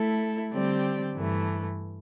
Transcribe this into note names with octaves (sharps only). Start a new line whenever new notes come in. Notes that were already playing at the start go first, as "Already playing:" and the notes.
Already playing: A3 E4 A4
D3 G3 C4 G4 D5
G2 E3 A3